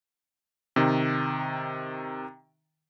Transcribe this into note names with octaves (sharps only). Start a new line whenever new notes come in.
C3 D#3